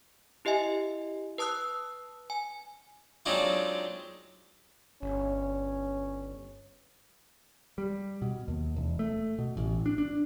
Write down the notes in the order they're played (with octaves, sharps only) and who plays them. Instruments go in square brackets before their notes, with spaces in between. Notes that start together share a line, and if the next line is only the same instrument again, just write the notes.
[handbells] E4 G4 D#5 E5 G#5
B4 A5 D#6 E6 F#6
G#5
[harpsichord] F#3 G#3 C4 D4 D#4 F4
[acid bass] G1 [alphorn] C#4
[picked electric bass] G3
B2
D#2
E1
A3
B2
A1
D4
D4